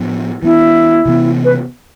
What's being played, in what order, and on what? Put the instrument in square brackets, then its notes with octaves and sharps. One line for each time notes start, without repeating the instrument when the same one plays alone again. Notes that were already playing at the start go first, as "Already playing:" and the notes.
Already playing: [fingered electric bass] A2 F3 B3 D4
[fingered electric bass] E3 B3 D4 [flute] E4
[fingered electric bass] C3 E3 B3
[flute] B4